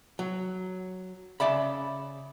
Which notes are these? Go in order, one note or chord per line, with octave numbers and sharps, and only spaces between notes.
F#3
C#3 D5 E5 B5